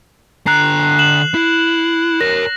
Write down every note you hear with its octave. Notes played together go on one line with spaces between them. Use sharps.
D3 A#5 F#6 C7
E7 F#7
E4
A#4 C#5 A#6